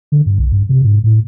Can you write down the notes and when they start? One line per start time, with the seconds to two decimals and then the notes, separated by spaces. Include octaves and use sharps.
0.12 D3
0.26 G2
0.38 B1
0.52 G2
0.69 C3
0.84 G#2
1.04 A2